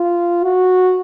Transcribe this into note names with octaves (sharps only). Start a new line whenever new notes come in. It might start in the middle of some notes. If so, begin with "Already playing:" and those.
Already playing: F4
F#4